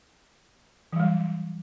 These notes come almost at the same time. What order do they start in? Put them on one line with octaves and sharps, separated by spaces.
E3 F#3 G3